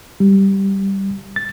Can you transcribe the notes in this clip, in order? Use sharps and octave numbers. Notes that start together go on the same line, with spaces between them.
G3
A6